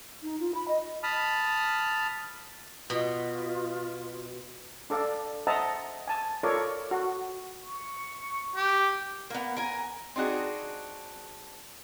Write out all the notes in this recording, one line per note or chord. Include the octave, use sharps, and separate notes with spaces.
D#4
F4
B5
D#5
A5 B5 D#6 F6
B2 F4
D4 A4 D5 F5
C5 D#5 E5 F#5 A5 A#5
G#5 A5
F4 A4 A#4 C#5 D5
F#4
C#6
G4
A#3 B3
A#4 G#5
C4 D4 D#4 F#4 G#4